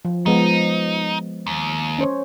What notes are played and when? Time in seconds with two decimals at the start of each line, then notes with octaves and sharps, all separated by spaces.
0.05 F3
0.26 F3 G#3 B3 D#4
1.47 D#2
1.99 C#4 C5 C#5